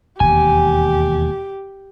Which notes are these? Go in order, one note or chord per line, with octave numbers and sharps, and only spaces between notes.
E1 D#2 G4 G#5